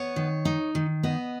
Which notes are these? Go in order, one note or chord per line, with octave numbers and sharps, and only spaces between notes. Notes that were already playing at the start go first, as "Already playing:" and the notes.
Already playing: B3 C#5
D#3
D#4
D#3
B3 D#5